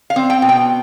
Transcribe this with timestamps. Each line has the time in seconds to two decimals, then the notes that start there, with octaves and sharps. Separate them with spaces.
0.10 F5
0.16 C4
0.30 G5
0.42 B2
0.49 G5